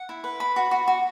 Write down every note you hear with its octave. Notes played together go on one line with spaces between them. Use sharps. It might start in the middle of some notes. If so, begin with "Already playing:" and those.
Already playing: F#5
E4
B4
B5
F#4
F#4
F#4